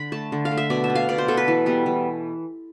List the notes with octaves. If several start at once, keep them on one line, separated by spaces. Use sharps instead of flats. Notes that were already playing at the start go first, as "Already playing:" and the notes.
Already playing: D3 B5
A3 A5
D3
F5
A3
E5
B2 D5
E5
B3
F5
B2 D5
C5
B3 A4
B4
E3
G3 B3
E3